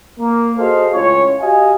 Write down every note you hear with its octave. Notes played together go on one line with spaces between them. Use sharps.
A#3
F#4 G#4 A4 C5 D#5 F5
C#2 A2 C#4 F4 C#5
F#4 G4 D#5 F5 G#5